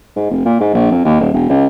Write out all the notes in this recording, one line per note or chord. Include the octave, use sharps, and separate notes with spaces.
G#2
F1
A#2
G#2
A#1
F2
D#2
D#1
E1
C#2